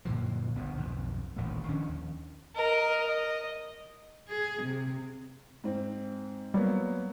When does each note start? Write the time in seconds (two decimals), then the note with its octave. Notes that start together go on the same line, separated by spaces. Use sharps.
0.05 F#2 A#2 D3 F3
0.55 G1 D2 D3 B3
0.77 B1 F2 G#2
1.36 D#1 A1 D2 A3
1.69 D#3 F3 C#4 D4
1.89 D#2
2.55 A#4 D#5
3.07 D#5
4.27 G#4
4.62 C3
5.64 G#2 C4
6.54 F#3 G3 A#3 B3